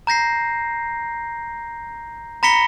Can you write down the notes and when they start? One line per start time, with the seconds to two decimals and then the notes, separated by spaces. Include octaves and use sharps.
0.07 A#5 G6 A#6 C7
2.43 A#5 B5 A#6 B6 C#7 G7